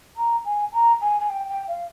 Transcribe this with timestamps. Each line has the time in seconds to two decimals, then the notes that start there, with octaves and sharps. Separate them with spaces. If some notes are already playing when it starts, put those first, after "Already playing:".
0.16 A#5
0.45 G#5
0.73 A#5
1.01 G#5
1.20 G#5
1.29 G5
1.49 G5
1.67 F5